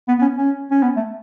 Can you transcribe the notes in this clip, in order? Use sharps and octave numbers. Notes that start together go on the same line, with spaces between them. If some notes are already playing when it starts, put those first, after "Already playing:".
B3
B3
C#4
C#4
C#4
B3
A3